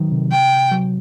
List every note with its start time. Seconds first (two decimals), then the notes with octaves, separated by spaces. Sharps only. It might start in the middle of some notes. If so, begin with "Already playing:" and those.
Already playing: D#3 F#3
0.12 C3
0.31 G5
0.72 F#3